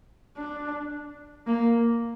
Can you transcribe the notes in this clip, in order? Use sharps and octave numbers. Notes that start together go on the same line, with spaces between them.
D4
A#3